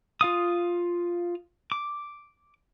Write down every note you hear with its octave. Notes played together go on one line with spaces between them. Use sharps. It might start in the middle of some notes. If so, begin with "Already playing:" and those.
F4 F5 D#6
D6